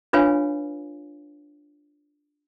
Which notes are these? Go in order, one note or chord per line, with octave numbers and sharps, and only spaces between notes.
D4 F4 B4 C#5 F5 G#5